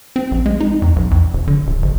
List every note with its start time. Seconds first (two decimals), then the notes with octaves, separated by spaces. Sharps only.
0.16 C4
0.31 A#1
0.46 G#3
0.60 D#4
0.82 F2
0.96 B1
1.11 F2
1.33 E1
1.48 D3
1.66 D1
1.82 G1